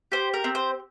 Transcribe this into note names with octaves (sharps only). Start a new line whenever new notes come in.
G4 C5
A#4
C4
C5